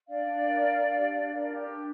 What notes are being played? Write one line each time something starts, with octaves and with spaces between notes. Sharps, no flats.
D4 D5 F5
D4
A#4
D4
D4
G4
D4
A#4
G4
D4